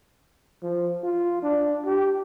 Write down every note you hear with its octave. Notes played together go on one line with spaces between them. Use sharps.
F3
F4
D4
G4